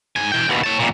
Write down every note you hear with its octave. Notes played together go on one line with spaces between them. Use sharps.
G#2 G#5
E3 G5
D#2 B2
C#5 A5
E2 A#2